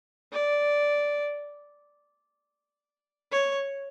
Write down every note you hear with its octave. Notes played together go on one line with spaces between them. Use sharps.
D5
C#5